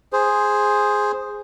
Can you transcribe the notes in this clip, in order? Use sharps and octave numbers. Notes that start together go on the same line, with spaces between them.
G#4 C5